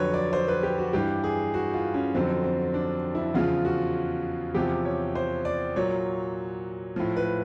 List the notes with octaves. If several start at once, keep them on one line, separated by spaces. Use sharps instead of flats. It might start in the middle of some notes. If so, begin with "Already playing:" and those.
Already playing: F2 D3 F#3 B4 C#5
D5
C5
B4
G4
F#4
G2 E3 G4
G#4
F#4
F4
C#4
F2 D3 F#3 C4
C4
D4
E4
E2 C#3 F3 F4
F#4
E2 C3 F3 G4
C#5
C5
D5
A#2 F#3 C#5
A2 F3
B4